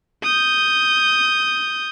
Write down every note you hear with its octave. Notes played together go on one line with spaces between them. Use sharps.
D#6 G6